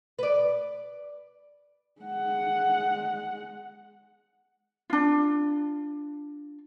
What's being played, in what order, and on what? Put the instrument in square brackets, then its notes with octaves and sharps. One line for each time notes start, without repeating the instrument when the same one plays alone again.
[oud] B4 D5
[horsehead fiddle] G#3 F#5
[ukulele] D4 F4